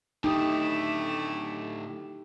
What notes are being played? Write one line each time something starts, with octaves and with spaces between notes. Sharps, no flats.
A2 D3 A3 D#4 E4 G4 D#6